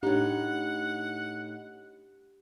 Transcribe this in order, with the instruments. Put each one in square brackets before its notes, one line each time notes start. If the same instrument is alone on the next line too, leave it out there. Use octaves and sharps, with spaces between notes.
[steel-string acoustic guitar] A2 D#4 [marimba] D4 [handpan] G4 [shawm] F#5